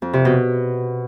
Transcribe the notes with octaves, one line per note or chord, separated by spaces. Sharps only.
F2
C3
B2